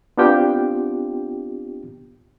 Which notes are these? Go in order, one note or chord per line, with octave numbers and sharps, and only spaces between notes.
B3 C4 D4 F4 G4 G5